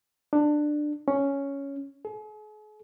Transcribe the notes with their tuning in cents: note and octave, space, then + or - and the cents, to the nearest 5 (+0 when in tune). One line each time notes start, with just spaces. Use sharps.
D4 +15
C#4 +5
G#4 +45